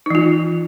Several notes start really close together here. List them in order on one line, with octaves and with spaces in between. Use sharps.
D#4 E3 F4